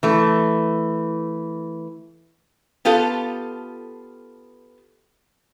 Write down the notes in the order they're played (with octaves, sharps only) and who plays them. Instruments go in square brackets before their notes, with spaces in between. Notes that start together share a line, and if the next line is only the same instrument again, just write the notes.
[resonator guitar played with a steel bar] E3 A3
B3 F4 G4 A4